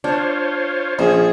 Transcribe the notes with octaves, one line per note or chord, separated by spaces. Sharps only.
D4 F4 C5 C#5
A#1 F3 C#4 G#4 C5